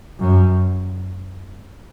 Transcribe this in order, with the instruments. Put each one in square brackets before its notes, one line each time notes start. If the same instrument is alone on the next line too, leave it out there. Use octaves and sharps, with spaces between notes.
[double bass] F#2